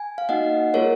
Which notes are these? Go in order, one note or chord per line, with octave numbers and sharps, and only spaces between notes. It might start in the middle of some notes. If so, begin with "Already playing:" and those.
Already playing: G#5
F5
A#3 D#4 F#4 D#5 F#5
A#3 F4 G#4 A#4 C#5